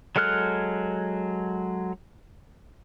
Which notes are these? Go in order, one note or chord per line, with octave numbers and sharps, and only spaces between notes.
F#3 G#3 A4 F6 F#6